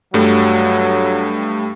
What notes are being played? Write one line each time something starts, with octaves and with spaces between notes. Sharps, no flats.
G2 F#3 G3 A3